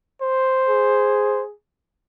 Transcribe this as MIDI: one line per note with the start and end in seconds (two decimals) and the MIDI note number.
0.22 1.43 72
0.68 1.54 68